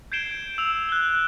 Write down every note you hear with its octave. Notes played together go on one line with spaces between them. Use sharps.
G6 G#6 C7 D7 E7 G7
E6 F7
F#6 G7